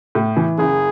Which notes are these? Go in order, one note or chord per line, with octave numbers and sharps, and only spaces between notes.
A2
E3
F#1 G#4